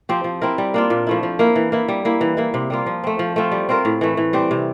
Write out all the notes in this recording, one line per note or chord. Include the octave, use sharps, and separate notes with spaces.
F3 C4 G4
F3
C4 E4 A#4
G3
A#3 D4 F4
A#2
F3 A3 E4
F3
A#3 E4 A#4
E3
A#3 E4
G3
A#3 E4
E3
A#3 E4
C3
G3 A#3 F4
F3
A3 C4
F3
A3 C4 F4
G3
C4 F4 A#4
A2
E3 A3
E3
G3 C4 G4
C3